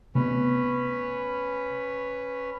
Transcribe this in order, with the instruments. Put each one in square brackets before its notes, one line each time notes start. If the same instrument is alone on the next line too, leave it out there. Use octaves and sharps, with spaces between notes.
[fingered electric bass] C3 A3 B3 [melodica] C#4 B4